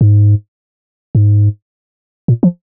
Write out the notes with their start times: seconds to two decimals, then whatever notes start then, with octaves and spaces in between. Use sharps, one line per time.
0.01 G#2
1.15 G#2
2.28 A#2
2.43 F3